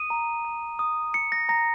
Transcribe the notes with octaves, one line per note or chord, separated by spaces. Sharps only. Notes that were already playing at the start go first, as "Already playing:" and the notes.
Already playing: D#6 D#7
A#5
A#5
D#6
D#6 C#7
A#6
A#5 A#6